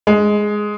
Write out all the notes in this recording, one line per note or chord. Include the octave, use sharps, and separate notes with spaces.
G#3